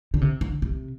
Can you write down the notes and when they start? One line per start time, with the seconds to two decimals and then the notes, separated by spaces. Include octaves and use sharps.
0.14 D3
0.21 C3
0.41 D3
0.62 C3